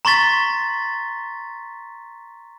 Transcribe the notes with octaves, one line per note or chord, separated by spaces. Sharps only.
A#5 C6 C#6 A6 B6